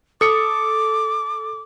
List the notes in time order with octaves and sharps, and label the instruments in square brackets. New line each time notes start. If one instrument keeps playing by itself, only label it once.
[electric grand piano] A4 C#7 [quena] D6 [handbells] D#6